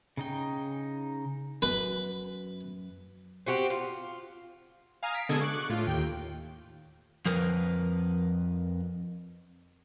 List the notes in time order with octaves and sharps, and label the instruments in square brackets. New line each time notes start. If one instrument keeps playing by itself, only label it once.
[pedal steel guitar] C#3 D#4 G5
[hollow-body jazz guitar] F#2 [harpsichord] B4
[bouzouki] C4 F#4 G4
F4
[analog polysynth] F5 G#5 A#5 D#6 F6
B6 C7 D7
B2 D3 G#3 A4 D#6 G#6
C#6 D6 F#6
A2 F4
D#2 G5
[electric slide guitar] F2 F3 A#4 B4